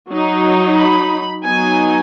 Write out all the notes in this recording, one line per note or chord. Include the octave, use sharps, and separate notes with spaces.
F#3 D#4
B5
F#3 B3 D#4 G#5